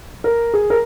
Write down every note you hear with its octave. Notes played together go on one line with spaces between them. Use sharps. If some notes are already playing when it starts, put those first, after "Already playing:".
A#4
G#4
A#4